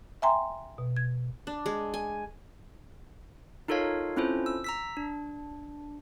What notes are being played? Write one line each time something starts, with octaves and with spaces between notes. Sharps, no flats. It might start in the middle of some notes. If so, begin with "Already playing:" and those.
E5 G5 G#5 A#5 C6
B2
G#6
D4
G#3
G#5
D#4 F4 A4 A#4 C#5 F5
C4 C#4 E4 F4 A4 C5
E6
A#5 E6 B6
D4